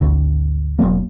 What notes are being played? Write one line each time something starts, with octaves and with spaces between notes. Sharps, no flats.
G#1 D2 D3
E1 F2 F#3 A#3